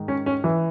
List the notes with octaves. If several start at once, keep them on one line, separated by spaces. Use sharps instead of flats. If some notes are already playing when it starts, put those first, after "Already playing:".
Already playing: G#2 D#3
C#4
C#4
E3